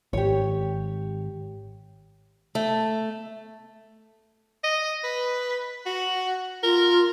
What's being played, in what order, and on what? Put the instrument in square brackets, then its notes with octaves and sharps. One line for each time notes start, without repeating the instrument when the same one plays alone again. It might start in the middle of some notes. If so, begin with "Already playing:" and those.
[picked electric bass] G#1 [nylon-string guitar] G4 C#5
[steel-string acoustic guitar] A3
[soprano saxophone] D#5
B4
F#4
[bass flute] F4 [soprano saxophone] A#4